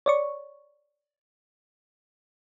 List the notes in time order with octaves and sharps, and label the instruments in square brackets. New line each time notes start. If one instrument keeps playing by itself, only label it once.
[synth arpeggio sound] C#5 D5 C#6